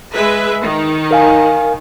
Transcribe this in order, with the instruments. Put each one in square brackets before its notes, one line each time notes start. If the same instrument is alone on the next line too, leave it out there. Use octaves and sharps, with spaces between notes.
[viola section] G#3 B4 E5
D#3
[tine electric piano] A#4 F5 G#5